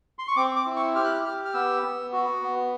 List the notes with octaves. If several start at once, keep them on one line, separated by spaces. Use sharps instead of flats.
C6
C#6
C4 D6
D6
E4
C#6
G4 F6
F#6
F6
G4 F6
F6
B3 E6
B3
F#4
B3